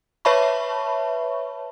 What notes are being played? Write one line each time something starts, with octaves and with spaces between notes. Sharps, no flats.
B4 C#5 E5 A5 B5 C#6